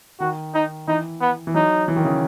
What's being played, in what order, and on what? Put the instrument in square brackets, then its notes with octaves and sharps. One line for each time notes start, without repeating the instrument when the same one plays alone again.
[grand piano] D#3 [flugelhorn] F#4
[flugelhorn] D#4
[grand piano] E3 [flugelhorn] D#4
[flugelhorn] B3
[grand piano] E3
[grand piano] F#3 [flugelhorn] D#4
[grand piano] E3
D#3
C#3